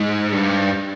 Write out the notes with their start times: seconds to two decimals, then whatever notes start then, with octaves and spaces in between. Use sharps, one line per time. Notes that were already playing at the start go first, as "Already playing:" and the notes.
Already playing: G#2
0.32 G2